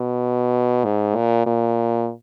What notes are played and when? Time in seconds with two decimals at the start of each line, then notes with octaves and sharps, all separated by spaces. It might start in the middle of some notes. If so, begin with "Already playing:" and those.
Already playing: B2
0.84 G#2
1.15 A#2
1.46 A#2